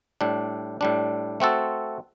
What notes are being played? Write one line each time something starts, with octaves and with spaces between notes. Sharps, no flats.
A2 G3 D4
A2 G3 D4
A3 C4 F#4 A4